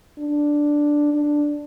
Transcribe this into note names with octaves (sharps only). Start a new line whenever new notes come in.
D4
D4